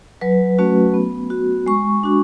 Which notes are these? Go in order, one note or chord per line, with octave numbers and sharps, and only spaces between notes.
F#3 B4
A3 C#4 F#4
B3
F#4
G#3 C#6
D4 F#4